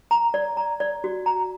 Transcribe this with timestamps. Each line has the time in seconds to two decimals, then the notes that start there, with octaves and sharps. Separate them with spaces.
0.11 A#5
0.34 D5
0.57 A#5
0.80 D5
1.04 F#4
1.26 A#5